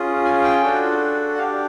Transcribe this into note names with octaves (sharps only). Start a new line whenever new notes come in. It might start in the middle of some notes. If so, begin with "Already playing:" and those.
Already playing: C#4 F4 G#4
G#5
G5
D4 F#4 A4
F#5
D4 G4 F5